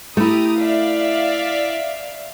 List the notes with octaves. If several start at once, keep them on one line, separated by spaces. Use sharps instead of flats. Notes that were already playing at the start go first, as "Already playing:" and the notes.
A3 E4 G4 A#5 D#6
D5 E5 F5